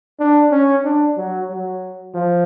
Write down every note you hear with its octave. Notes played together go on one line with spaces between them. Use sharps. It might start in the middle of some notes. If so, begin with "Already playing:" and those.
D4
C#4
D4
F#3
F#3
F3